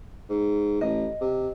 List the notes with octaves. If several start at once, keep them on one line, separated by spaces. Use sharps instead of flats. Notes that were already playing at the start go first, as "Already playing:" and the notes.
G#2
A1 D#5
C3